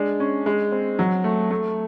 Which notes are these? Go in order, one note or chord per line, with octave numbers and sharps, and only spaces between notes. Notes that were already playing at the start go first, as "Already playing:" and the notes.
Already playing: G#3 D4
C#4
G#3
C4
F#3
A3
A3